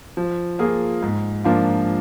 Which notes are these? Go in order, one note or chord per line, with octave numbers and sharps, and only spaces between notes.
F3
A#3 F4 G#4
G#2
F3 A#3 D4 F4